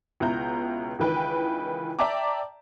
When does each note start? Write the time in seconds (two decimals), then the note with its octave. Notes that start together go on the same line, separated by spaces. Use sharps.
0.20 C#2 B2 E4 A#5 G6
0.99 C#2 D#3 E3 B4 G5
1.99 D5 E5 G5 A5 A#5 D6